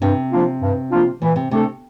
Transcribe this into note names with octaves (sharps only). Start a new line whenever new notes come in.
G2 C3
F3 A#3 D4 F4
G2
F3 A#3 D4 F4
A#2 E3
C3
C3 A3 D4 A4